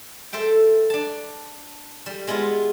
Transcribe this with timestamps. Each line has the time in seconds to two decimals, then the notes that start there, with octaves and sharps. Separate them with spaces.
0.33 A4 C5 E5 G5
0.90 D4 A5
2.06 G3
2.27 G#3 B3 E4 F4